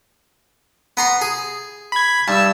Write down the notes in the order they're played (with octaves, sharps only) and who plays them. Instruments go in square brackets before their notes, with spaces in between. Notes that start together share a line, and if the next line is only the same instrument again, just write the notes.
[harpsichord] B3 A#5 C6
G#4
[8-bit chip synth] B5 G#6
[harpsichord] G2 [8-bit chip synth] A5 E6